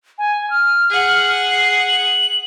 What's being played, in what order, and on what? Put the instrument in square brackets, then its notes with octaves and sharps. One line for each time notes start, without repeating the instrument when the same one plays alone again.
[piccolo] G#5
F6
[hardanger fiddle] G#4 F#5
[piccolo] C7
F#7